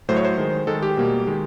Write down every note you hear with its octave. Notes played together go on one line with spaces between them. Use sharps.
A2 F#3 A3 C5
C#5
C5
D#3 G#3
D#3 G#3 A4
G4
B2 G3 A#3
D#3 G#3